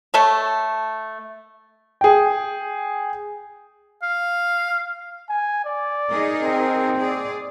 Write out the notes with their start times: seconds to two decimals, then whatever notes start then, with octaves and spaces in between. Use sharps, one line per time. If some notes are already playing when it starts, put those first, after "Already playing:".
0.14 A3 A4 C#5
2.01 G#4 G5
4.03 F5
5.30 G#5
5.65 D5
6.10 D#4 G#4 A#4
6.43 C4
6.97 G#4 D5